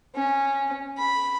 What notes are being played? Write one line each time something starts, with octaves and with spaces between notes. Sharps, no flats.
C#4
B5